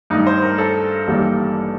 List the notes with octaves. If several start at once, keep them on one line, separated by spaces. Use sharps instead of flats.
G2 D#3 A3 D#4
C5
A#4
A4
A1 G2 D#3 G3 A#3